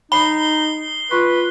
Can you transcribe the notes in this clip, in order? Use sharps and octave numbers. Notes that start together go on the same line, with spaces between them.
D#4 B5 C7 G7
F4 B4 C6 C#6